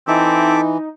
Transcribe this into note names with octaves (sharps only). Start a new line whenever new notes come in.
E3 C4 D#4 A4 E5 D6